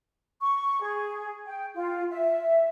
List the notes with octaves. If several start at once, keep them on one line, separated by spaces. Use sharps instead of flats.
C#6
G#4
G5
F4
E5